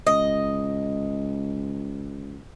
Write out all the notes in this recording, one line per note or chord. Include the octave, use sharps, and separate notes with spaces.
C#2 D#5